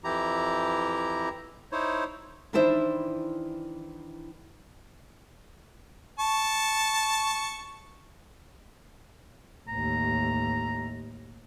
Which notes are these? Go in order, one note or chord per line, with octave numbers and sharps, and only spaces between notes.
F2 E3 E4 G4 A#5
D#4 E4 C5 C#5
D#3 E3 D4 E4 C5 E5
A5 C#6
A1 D#2 A#5